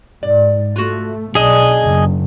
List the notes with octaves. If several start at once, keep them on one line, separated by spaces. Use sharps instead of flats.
G#2 D5
A3 F4 F#4
B1 D4 G#4 D#5
F#1 C#3